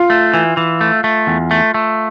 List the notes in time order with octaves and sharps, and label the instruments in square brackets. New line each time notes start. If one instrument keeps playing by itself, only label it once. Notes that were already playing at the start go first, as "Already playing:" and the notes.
Already playing: [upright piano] F4
[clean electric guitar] A3
E3
E3
A3
A3
E2
A3
A3